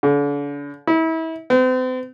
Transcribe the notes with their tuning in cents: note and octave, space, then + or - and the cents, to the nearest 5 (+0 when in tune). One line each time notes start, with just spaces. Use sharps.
D3 -40
E4 -30
C4 -40